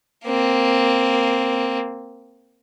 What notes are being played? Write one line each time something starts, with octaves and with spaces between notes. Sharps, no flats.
A#3 C4